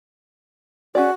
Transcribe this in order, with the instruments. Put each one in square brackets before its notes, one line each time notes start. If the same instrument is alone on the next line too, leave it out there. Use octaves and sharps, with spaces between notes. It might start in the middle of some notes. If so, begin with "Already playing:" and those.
[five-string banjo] C#4 G#4 D5 [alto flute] F#4